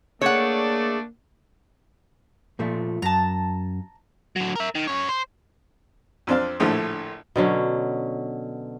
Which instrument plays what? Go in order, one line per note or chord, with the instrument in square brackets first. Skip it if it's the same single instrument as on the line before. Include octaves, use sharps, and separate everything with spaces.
[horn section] A3 D4 D5 [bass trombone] A#3 [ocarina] G#4 [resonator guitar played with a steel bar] C#5 F#5
[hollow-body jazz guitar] A#2 F3 A3
[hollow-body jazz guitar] F#2 [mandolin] A5 A#5
[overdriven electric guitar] D3 F#3
A#4 E5
D#3
F#2 C#5
C5
[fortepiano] F2 C4 D4 F5
A#1 A2 D3 F3 A3
[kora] B2 D3 F#3 C#4